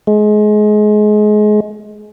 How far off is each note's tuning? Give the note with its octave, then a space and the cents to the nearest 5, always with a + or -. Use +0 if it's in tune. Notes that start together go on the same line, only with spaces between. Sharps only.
G#3 +25